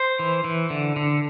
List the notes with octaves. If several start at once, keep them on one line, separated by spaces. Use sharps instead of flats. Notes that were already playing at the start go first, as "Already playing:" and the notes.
Already playing: C5
E3
E3
D3
D3